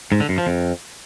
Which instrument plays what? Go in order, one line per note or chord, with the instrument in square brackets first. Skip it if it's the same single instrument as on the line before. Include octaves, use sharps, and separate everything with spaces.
[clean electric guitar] G#2
D3
F#2
F3
F2